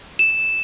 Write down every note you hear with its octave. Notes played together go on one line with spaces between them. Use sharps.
E7